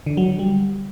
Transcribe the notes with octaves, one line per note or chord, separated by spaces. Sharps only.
D3
F#3
D3
G3